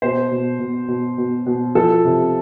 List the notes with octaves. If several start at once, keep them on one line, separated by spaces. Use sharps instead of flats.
B2 C5
B2
B2
B2
B2
B2
F3 A4
C3